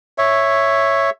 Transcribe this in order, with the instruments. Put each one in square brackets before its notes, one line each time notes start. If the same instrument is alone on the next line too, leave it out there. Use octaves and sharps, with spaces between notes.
[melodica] C#5 E5